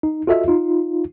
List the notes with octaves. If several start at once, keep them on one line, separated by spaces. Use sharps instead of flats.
D#4
F4 F#4 A4 D#5 E5
D#4 F4